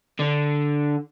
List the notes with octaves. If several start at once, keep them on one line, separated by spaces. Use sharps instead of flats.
D3